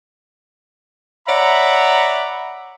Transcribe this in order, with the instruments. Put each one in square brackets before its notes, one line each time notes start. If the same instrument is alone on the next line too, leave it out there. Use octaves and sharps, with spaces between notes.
[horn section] C#5 D5 E5 F#5 A#5 B5